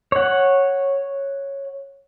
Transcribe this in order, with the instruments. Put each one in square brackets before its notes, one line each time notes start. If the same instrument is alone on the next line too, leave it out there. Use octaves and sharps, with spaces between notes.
[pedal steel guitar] C#5 F#5